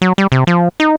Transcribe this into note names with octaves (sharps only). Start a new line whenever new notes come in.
F#3
G3
C3
F3
D#4